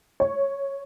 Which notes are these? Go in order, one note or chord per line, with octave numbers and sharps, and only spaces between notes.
C#5